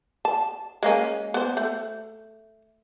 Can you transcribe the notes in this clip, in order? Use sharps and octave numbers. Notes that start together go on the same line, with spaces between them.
A5
G#3 A#3 C#4
B3 C5
A3